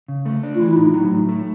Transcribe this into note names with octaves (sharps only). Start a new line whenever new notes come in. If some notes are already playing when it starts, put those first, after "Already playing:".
C#3
A3
D4
F4
E3
E4
A2 D#4
F#3
A2
A3